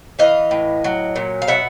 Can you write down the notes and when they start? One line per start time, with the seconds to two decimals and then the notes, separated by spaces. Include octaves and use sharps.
0.19 E3 D#5 F5
0.51 A2
0.84 F#3
1.16 A#2
1.42 F5
1.48 B2 E5 F#5